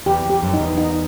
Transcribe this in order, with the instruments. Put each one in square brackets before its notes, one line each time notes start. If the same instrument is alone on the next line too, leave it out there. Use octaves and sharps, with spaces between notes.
[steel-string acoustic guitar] E2 [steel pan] G4
[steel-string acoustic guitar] F2
[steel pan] G4
[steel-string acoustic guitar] F#2
[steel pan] D#4
[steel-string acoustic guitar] E2
[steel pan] D#4